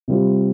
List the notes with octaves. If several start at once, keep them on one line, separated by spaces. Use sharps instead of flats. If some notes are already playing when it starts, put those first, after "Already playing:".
C3 G3 C4 F4